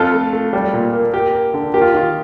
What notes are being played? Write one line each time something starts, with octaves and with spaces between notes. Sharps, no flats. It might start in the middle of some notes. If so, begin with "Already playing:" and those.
Already playing: F2 F4 A4
A3
A3
G3
A#2
A#3
A#3 G4
A#3
D3
A#3 G4
F4
D#3 F4